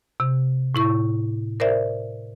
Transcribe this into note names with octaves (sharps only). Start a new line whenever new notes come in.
C3
A2 E4 C#6
A#4 C5 D5 E5